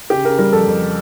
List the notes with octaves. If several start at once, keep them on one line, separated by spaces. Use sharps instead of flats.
C#3 G4
C#3 A#4
G3 A#4
F2 A4
F2